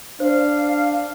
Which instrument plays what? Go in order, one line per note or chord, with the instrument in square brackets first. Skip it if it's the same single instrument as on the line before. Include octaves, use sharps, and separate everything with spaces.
[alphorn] D4 [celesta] C5 [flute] F5